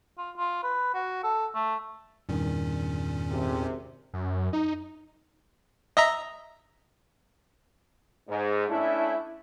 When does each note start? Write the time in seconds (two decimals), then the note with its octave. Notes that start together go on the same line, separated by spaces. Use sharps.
0.18 F4
0.37 F4
0.63 B4
0.94 F#4
1.23 A4
1.55 A3
2.29 E2 G2 A#2 D#3 C#4
3.31 G#1 C3
4.14 F#2
4.53 D#4
5.97 D#5 E5 A#5
8.28 G#2
8.68 A3 C#4 D4 E4